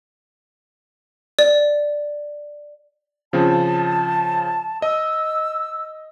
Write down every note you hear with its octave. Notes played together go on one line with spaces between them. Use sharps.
D5
C#3 F3 C4 A5
D#5 E6